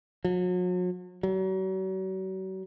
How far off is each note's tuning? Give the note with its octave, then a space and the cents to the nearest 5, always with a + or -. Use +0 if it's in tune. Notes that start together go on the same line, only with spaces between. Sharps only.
F#3 -40
F#3 +40